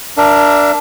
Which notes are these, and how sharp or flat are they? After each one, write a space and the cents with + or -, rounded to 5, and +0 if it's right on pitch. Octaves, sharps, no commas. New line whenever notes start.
D4 +0 A#4 +0 E5 +40